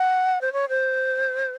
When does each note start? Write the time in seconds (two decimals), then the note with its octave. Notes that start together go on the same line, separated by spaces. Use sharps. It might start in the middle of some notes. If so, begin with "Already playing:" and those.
Already playing: F#5
0.41 C5
0.53 C#5
0.69 C5